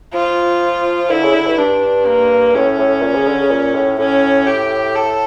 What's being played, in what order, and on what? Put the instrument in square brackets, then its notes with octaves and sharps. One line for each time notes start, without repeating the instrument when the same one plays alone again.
[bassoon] F3 [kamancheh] F4
[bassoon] D3 [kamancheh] E4
[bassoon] C#3
D3
G2
[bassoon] G2 [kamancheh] D4
[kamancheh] A#3
[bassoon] A2 [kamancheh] C#4
[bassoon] A2
A#2
C#3
D3
C#3
A#2
A2
[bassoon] A2 [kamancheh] C#4
[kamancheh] G4
A4